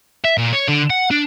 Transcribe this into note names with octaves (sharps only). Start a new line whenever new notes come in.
E5
A#2
C#5
D3
F#5
D4